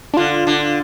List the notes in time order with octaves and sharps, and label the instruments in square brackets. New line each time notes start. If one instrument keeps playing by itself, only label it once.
[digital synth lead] D4
[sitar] D3 [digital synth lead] F4
[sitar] D3